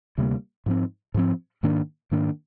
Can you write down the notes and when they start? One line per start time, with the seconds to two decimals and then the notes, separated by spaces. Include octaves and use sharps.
0.18 D2 C3 G3 A#3
0.66 G#2 F3 C4
1.14 G#2 F3 C4
1.63 G#2 D#3 A#3 D4
2.11 G#2 D#3 A#3 D4